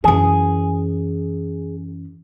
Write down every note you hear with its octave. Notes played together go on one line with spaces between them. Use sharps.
F#2 E3 G#4